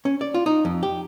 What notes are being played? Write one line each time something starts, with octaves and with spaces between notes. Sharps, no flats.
C#4
D5
F4
D#4
F2
G4